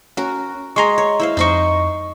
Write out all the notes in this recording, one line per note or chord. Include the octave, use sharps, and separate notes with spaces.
C#4 F#4 A#4
G#3 G#4 A#5 C6 C#6
C#5
E4 C5 F5
F2 D#4 C5 D#5 C#6